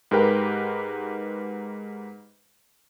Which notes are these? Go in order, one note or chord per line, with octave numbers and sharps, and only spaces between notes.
G#2 G4 A#4 B4 G5